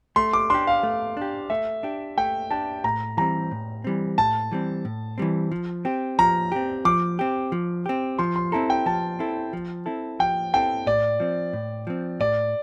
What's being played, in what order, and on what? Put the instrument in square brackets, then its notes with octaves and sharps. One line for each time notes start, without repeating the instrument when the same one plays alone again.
[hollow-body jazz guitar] A3 [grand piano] C6
[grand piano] D6
[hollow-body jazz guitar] D4 G4 [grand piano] C6
[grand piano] F5
[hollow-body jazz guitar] A3
D4 G4
[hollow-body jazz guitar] A3 [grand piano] E5
[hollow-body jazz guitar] D4 G4
[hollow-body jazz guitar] A3 [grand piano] G5
[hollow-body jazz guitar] D4 G4 [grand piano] A5
[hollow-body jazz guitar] A2 [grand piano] A#5
[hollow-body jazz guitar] E3 G3 C4 [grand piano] A#5
[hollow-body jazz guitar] A2
E3 G3 C4
[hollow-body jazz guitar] A2 [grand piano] A5
[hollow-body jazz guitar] E3 G3 C4
A2
E3 G3 C4
F3
C4 G4
[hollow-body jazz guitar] F3 [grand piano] A#5
[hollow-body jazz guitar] C4 G4
[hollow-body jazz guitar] F3 [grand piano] D6
[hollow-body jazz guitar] C4 G4
F3
C4 G4
[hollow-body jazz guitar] F3 [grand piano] C6
[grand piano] C6
[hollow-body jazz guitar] C4 E4 A4 [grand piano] A#5
[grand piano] G5
[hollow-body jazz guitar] F3 [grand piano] A5
[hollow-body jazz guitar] C4 E4 A4
F3
C4 E4 A4
[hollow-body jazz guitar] F3 [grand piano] G5
[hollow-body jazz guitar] C4 E4 A4 [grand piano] G5
[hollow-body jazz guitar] A2 [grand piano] D5
[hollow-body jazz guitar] F3 C4
A2
F3 C4
[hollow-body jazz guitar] A2 [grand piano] D5